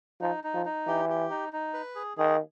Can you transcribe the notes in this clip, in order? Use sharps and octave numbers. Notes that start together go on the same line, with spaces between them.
F3 D#4
D#4
F3
D#4
E3 G4
G4
D#4
D#4
B4
G#4
D#3 G#4